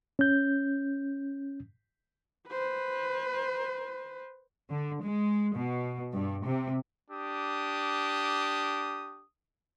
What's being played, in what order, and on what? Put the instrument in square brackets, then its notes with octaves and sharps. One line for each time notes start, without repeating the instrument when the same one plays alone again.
[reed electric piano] C#4 G6
[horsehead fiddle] B4 C5
[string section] D3
G#3
B2
G2
C3
[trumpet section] D4 G4 D#6